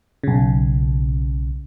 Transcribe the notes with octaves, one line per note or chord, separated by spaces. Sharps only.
B1 C#3